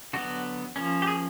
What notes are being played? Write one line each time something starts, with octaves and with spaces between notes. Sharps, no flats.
D3 F#3 B3 F#4
F3 A#3 C#4
G4
G#4